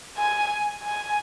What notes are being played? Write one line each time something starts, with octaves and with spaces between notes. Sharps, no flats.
G#5
G#5